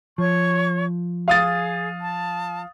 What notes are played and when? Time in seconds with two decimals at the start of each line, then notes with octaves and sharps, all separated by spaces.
0.18 F3 C#5 C#6
1.28 G#4 F5 D#6 A6
2.00 A5